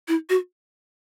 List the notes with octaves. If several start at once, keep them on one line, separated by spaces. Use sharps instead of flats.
E4
F#4